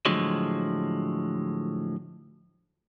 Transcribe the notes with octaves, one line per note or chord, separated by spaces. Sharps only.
A2 D3 F3 F#3 G#3